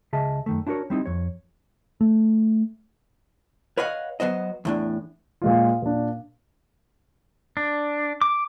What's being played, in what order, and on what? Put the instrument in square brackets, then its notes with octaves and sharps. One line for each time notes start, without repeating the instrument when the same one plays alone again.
[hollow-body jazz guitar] C#2 C#3 G#4 D#5 E5 A5
F#2 D#3 A3
D4 E4 F#4 A#4 C#5
G3 C4 D#4 E4
F2 C#5
[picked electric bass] A3
[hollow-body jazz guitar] B4 C#5 D#5 F5 F#5
F#3 B3 C5 D#5
E2 A2 D4
[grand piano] A#2 G#3 F4
A#2 D4
[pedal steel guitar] D4
D6